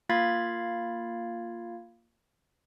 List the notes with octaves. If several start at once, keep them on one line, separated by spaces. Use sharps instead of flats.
A#3 F4 F5 B5 G#6 A6